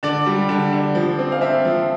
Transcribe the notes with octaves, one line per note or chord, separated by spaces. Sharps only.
D3 D5
G3
D3
D3
F3
C4
F5
C4 E5
F3